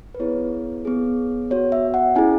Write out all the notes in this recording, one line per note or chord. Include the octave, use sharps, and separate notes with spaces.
B4
B3 E4 G#4 C#5
B3 G#4
B3 F#4 C#5
E5
F#5
C#4 E4 G#4 G#5